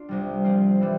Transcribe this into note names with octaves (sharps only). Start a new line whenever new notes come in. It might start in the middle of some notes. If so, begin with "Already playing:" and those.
Already playing: D4 F4
C2 C3 G3
F3 C4 F4
E3 G3